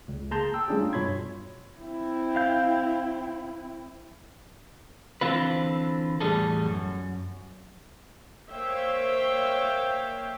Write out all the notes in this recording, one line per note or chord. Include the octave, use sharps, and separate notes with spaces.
C#2
A#3 G#4 A5 A#5 C6 G6
G5 E6
G3 A3 C#4 D4 F4 G#4
F4
G2 B2 C#5 B5 C6 G#6
C4 E4
F5 G6
D3 E3 C4 F4 B4
E2 A2 C#3 G3 G#4 A4
F#2
A#3 C5 C#5 E5 F5 G5